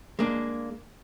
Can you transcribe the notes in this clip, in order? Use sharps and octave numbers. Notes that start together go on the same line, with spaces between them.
G#3 A#3 D4